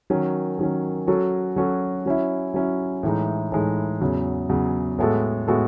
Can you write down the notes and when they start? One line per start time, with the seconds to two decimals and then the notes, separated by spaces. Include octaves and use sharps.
0.10 D#3 F#3 C#4
0.59 D#3 F#3 C#4
1.07 F#3 C#4 F#4 A4
1.56 F#3 C#4 F#4 A4
2.06 F#3 C#4 E4
2.54 F#3 C#4 E4
3.03 A2 E3 G#3 D#4
3.52 A2 E3 G#3 D#4
4.01 E2 C#3 F#3
4.49 E2 C#3 F#3
4.98 A2 G#3 B3 F#4 A4
5.47 A2 G#3 B3 F#4 A4